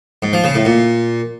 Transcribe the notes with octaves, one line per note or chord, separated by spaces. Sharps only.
G#2
F3
C#3
A2
A#2